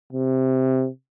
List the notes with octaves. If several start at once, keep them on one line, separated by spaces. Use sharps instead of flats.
C3